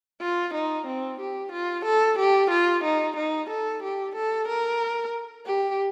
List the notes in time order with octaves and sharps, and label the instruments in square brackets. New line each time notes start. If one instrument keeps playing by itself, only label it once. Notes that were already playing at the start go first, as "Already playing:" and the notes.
[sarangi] F4
D#4
C4
G4
F4
A4
G4
F4
D#4
D#4
A4
G4
A4
A#4
G4